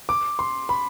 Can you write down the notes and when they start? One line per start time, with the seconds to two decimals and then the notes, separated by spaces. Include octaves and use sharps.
0.09 D6
0.39 C6
0.69 B5